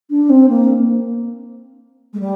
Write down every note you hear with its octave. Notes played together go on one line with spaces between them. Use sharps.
D4
C4
A#3
G#3
G3